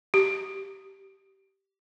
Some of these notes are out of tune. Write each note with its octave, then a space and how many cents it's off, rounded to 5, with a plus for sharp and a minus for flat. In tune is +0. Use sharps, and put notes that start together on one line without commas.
G4 -15